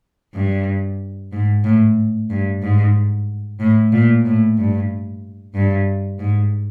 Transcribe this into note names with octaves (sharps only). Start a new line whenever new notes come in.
G2
G#2
A2
G2
G#2
A2
A#2
A2
G2
G2
G#2